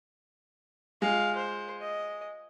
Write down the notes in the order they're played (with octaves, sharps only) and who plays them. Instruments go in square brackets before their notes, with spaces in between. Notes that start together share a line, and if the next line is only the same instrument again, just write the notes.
[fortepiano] G#3 [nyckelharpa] F4 F5
[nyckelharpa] C5
D#5